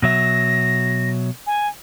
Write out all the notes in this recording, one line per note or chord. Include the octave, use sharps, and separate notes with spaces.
B2 F#3 E5 A#6
G#5